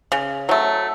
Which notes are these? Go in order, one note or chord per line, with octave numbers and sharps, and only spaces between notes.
C#3
F#3 A3